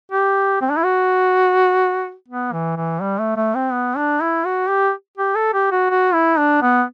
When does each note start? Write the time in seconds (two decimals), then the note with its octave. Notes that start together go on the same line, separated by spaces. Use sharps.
0.12 G4
0.61 C4
0.70 D4
0.77 E4
0.84 F#4
2.28 B3
2.53 E3
2.76 E3
3.01 G3
3.19 A3
3.37 A3
3.55 C4
3.73 B3
3.97 D4
4.21 E4
4.46 F#4
4.69 G4
5.17 G4
5.35 A4
5.54 G4
5.72 F#4
5.90 F#4
6.14 E4
6.38 D4
6.62 B3